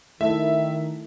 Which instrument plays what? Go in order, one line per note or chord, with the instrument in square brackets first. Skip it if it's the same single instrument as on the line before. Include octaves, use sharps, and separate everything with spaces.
[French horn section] D#3 [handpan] A3 E4 A4 [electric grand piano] E5